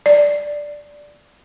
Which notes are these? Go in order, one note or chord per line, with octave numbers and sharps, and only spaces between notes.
D5